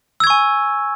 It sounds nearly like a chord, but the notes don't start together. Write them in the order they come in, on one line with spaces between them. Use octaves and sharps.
E6 G#6 C#6 G#5